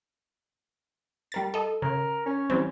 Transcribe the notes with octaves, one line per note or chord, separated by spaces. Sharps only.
G3 A#4 A6
A4 D#5
C#3 A#4
C#4
E3 G3 C4